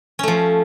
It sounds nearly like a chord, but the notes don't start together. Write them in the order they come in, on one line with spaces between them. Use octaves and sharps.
C#4 A3 F3